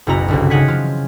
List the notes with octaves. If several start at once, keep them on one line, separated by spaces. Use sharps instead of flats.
F#1 B1 E4 F#4 A#5
G1 C2 C#3
C#3 D#4 C#5 F#5 G#5 B6
F3 F#3 F4